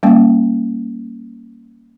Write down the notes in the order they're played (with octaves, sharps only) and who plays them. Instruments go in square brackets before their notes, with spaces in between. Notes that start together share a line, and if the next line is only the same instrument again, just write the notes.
[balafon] G3 A#3 C#4